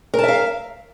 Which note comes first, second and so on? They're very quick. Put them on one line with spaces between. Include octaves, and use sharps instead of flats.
A#4 A5 E5 F5